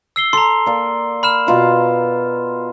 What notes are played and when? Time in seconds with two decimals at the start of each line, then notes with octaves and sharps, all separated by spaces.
0.16 E6 C7 G7
0.33 A4 A#5 C6
0.66 A#3 D5
1.23 B5 F6 E7
1.47 B2 F4 A#5